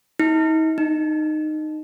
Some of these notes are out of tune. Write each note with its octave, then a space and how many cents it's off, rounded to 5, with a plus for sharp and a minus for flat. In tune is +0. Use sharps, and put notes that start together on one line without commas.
D#4 +40
D#4 -15